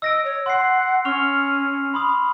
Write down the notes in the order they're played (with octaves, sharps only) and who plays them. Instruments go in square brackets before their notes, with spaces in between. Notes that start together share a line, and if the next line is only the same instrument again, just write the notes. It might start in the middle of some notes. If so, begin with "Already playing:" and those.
[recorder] D#5 [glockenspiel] E6 A#6 D7
[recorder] C#5
[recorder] F#5 [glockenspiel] C6 C7
[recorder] C#4 [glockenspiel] C#6 F6 F7
[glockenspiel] B5 C6 D#6